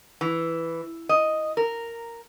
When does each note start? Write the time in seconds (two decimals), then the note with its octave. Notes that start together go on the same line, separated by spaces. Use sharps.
0.21 E3
1.09 D#5
1.57 A#4